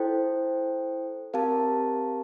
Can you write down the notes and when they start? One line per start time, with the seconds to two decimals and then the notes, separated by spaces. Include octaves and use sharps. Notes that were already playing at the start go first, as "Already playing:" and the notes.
Already playing: E4 A4 C5 G5
1.34 C4 G4 A#4 F5 A5